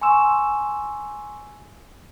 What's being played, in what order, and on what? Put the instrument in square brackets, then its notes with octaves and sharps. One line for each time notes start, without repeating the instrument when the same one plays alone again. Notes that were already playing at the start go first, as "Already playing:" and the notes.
[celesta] G#5 C6 C#6 E6 E7